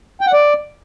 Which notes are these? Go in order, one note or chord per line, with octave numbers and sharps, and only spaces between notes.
G5
F#5
D5